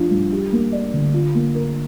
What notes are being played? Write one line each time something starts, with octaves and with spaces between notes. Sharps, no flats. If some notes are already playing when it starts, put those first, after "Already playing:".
Already playing: F3 D4 F4
G2
G4
A#3
D5
D3
F4
A#3
A#4